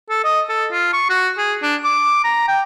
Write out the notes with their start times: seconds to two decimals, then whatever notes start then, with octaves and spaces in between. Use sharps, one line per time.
0.10 A4
0.24 D#5
0.49 A4
0.72 F4
0.93 C#6
1.10 F#4
1.38 G#4
1.62 D4
1.84 D6
2.24 A#5
2.48 G5